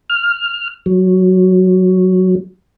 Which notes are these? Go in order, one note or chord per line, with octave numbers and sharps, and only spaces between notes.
F6
F#3